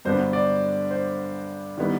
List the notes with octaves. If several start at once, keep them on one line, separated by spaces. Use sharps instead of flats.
G2 D3 F#3 B3 D4 C5
D5
C5
D#3 G3 B3 E4